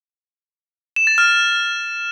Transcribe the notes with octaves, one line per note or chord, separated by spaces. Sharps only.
E7
A6
F6